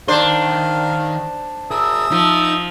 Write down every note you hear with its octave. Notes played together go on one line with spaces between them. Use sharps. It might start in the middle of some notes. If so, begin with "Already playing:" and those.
D#3 D4 A#4 C5 F5
G#4 A#4 E5 D#6 E6
F3 D#4